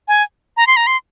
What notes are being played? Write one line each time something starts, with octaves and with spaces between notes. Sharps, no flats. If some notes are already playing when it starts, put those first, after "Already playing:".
G#5
A#5
C6
A#5
C6